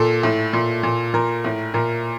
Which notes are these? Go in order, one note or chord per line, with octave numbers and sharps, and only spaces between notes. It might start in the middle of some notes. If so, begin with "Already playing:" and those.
Already playing: A#2 A4
A2
A#2
A#2
A#2 A#4
A2
A#2 A#4